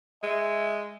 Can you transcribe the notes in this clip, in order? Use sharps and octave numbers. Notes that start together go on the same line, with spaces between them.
G#3 E5